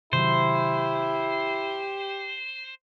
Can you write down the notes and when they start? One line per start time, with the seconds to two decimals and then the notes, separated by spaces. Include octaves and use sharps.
0.13 C3 D#3 F#3 E4 G4 C5